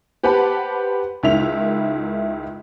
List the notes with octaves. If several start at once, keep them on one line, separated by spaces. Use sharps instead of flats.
G4 B4 C5 F#5 A5 B5
C#2 D#3 E4 E5 F7